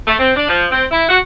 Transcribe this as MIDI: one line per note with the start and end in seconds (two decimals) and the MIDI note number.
0.06 0.14 57
0.19 0.34 60
0.36 0.45 62
0.49 0.66 53
0.71 0.84 60
0.92 1.09 64
1.09 1.18 66